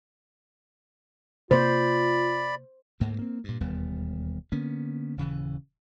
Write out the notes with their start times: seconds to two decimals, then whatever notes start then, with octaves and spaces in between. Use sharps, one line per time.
1.51 C3 A#3 F4 C5 D5 B5
3.00 D2 G#2 A3 A#3
3.19 A#3 C4
3.44 G2 A#2
3.60 E1 D#2 G3 B3
4.52 D3 A#3 B3 C#4
5.17 D#1 C#3 E3